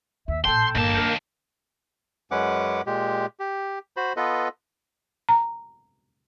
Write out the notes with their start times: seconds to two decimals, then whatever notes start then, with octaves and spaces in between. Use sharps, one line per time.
0.28 D#2 E5
0.45 A1 A#2 A4 G5 A5 C6
0.75 G1 D#2 A#3 A5
0.94 G3 D4 A#4 G6
2.31 F#2 G#3 C#4 B4 F#5 D6
2.87 A#2 G#3 G4
3.40 G4
3.97 F#4 C5 B5
4.17 B3 F4 A4 B4 D#5
5.29 A#5